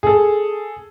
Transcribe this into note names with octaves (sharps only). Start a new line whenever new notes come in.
G#4 A4